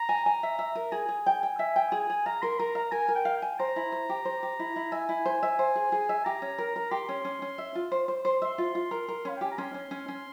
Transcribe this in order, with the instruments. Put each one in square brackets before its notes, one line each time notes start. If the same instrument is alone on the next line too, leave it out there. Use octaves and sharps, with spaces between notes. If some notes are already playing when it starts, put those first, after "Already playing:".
Already playing: [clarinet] A#5
[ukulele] G#5
G#5
E5
E5
A#4
[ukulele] G#4 [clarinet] G#5
[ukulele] G#4
G5
G5
E5
G5
G#4
G#4
[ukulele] F5 [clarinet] A#5
[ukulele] A#4 [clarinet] C6
[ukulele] A#4 [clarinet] A#5
[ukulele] F5 [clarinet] A#5
[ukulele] A#4 [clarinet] G#5
[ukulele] A#4
[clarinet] G5
[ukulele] F5
[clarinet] G5
[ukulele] G#5
[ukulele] C5 [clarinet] A#5
[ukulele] E4
C5
G4
C5
G4
E4
E4
[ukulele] E5 [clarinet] G#5
[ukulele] E4
C5
E5
C5
G#4
G#4
E5
[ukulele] G4 [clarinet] A#5
[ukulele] C#4
A#4
A#4
[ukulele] G4 [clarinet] C6
[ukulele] C#4
C#4
C#4
E5
F4
C5
C5
[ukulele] C5 [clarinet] C6
[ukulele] E5 [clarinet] C6
[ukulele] F4
F4
A#4
A#4
[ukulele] C#4 [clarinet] F5
[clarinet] G5
[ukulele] G4 [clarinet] G#5
[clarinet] A#5
[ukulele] C#4 [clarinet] C6
[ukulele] C#4
C#4
C#4